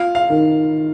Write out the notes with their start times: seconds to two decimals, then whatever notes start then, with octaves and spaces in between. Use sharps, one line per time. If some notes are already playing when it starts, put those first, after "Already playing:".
Already playing: F4 F5
0.15 F5
0.30 D#3